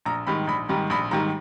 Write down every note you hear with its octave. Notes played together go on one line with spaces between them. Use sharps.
A#1 A#5
G#2 D#3 G3 B5
A#1 B5
G#2 D#3 G3 B5
A#1 B5
G#2 D#3 G3 A#5